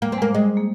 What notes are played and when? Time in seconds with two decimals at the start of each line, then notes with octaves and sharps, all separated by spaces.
0.02 G3 A#3
0.12 C4
0.18 G#3 A#3
0.35 G3 G#3
0.57 A#3